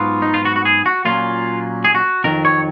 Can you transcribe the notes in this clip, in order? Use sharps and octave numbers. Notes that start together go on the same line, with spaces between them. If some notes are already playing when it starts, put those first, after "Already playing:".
Already playing: G#2 F#3 B3 F4
D#4
F4
F#4
F#4
G#4
F#4
A#2 F#3 A#3 C#4 F4
G#4
F#4
F2 D#3 F#3 A#4
C#5